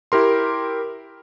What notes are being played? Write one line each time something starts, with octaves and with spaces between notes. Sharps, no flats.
E4 G4 A#4 C6